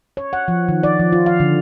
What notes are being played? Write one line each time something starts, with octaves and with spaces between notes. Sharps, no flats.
C#5
F#5
F3
D#3
D5
F3
F4
F5
D3